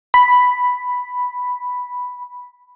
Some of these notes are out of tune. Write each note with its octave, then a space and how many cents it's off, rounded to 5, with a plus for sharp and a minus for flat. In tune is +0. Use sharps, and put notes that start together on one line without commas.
B5 +0